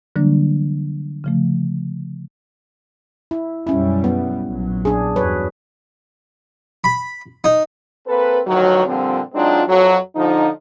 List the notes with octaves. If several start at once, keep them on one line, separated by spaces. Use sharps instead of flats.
D3 E3 F#3 G3 A#3 D4
C#3 F3 A3
E4
B1 F#2 G3 C#4 E4
B3
A#1 F#3
D4 G#4
E2 G2 F#3 B4 C#5
B5
D#4
A#3 C4 A4 B4
D2 D#3 F3 F#3
A#2 D3 F3 G3 C4
F#3 G#3 C4 D4 D#4 F4
F2 F#3
D3 F3 D#4